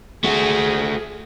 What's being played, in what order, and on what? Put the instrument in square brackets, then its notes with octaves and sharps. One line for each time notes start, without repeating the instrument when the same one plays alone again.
[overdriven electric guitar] A3 F#4 [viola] G#4